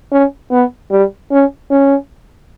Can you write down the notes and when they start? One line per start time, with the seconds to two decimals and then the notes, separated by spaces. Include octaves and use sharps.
0.12 C#4
0.51 B3
0.91 G3
1.31 C#4
1.71 C#4